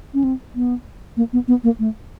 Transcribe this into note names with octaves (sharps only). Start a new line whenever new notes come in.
C#4
C4
B3
A#3
B3
B3
A#3
A3